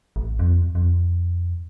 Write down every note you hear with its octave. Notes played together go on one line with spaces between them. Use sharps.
A1
F2
F2